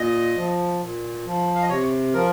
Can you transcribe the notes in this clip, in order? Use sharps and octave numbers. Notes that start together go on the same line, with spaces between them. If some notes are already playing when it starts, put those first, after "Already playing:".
Already playing: A#2 D#5
F3
A#2
F3
F5
D#5
C3 C#5
F3 A#4